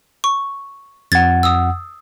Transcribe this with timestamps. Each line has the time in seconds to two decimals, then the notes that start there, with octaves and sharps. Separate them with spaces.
0.24 C#6
1.12 F2 F#5 G#6 A6
1.43 D#6 E6